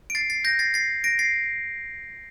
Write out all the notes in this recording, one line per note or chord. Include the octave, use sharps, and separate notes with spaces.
D7
A6 C7
A6 C7
G6 A#6
A6 C7
A6 C7
A#6 D7
A6 C7